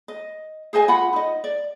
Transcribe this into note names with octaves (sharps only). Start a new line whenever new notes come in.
D#5
G#4 C5 D#5 G#5
F4 F#5 B5
D#4 D#5
D5